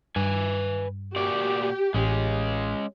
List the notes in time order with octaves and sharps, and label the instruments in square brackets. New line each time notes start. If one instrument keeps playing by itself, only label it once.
[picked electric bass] G2 [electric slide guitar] B4 G#5
[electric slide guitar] A#2 F#4 D5 [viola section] G4
[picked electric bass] A1 [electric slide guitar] G#3 C#4